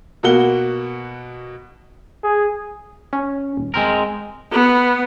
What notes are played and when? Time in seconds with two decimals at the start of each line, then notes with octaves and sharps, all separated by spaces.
0.23 B2 A#3 F#4 F#5 G7
2.23 G#4
3.13 C#4
3.57 D#1
3.74 G#3 C4 A#4
4.52 B3